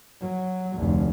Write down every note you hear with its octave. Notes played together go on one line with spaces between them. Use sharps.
F#3
F1 D2